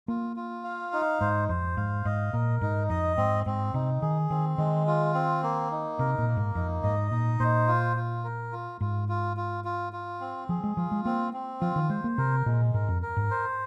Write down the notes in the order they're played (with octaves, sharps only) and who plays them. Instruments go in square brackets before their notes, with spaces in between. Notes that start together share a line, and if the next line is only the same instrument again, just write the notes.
[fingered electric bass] A#3 [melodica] F4
[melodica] F4
F5
D#4
[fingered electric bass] G#2 [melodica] C5
[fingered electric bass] F2 [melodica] C5
[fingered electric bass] G#2 [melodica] F5
[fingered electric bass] G#2 [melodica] D#5
[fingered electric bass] A#2 [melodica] A#4
[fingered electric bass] G#2 [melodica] D#4
[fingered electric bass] F2 [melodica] D#5
[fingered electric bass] G#2 [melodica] C4
[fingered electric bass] G#2 [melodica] C4
[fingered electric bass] C3 [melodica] D#4
[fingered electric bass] D#3 [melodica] G#4
[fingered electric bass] D#3 [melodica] C4
[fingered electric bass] D#3 [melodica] G#3
[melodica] F4
C4
A#3
D#4
[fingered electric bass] C3 [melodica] A#4
[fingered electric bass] A#2
[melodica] A#3
[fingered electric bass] G#2
[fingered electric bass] F2 [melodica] D#4
[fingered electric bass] G#2 [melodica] D#5
[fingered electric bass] A#2 [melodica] D#4
[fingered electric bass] A#2 [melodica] C5
[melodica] F4
F4
A#4
F4
[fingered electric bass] G#2 [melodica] F4
[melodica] F4
F4
F4
F4
C4
[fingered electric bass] F3 [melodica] G#4
[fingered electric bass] G#3
[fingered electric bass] F3 [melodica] F4
[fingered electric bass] G#3
[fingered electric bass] A#3 [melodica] C4
[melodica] C4
[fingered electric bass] F3 [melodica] F4
[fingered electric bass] D#3
[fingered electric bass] G#3 [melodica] C5
[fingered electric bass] A#3
[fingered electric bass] C3 [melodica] A#4
[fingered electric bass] A#2 [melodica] G#3
[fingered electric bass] G#2 [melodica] A#4
[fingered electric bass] F2
[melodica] A#4
[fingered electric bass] G#2
[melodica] C5